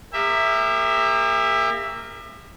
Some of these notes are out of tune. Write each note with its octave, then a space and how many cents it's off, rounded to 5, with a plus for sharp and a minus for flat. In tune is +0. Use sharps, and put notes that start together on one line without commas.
A#3 -15 G4 +45 E5 +0